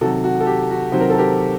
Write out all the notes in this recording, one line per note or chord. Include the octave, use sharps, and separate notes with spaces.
C3 D#3 F#3 F#4 A4
F#4
A4
G4
F#4
C3 D#3 F#3 C5
A#4
A4
G4 A#4